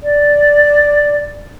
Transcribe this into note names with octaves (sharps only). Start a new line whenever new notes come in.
D5